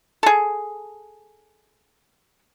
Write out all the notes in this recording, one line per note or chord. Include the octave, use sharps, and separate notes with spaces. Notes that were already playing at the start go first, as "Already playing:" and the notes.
G#4 A4